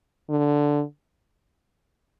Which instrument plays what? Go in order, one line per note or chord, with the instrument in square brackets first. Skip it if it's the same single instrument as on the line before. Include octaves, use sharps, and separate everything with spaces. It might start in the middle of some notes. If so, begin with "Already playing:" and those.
[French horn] D3